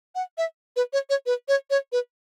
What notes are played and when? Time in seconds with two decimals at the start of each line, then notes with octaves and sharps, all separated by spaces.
0.15 F#5
0.38 E5
0.76 B4
0.93 C#5
1.10 C#5
1.26 B4
1.48 C#5
1.70 C#5
1.92 B4